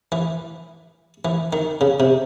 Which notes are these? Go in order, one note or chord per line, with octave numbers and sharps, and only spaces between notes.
E3
E3
D#3
C#3
C3